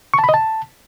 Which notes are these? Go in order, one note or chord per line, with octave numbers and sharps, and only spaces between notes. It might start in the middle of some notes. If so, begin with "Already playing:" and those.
C#6
A5
B5
D#5
A5